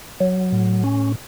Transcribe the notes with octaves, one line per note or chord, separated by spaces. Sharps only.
F#3
A2
C#4